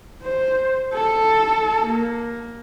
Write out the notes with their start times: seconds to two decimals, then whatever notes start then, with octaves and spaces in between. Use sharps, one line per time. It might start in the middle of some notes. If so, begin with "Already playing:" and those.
0.22 C5
0.93 A4
1.86 A#3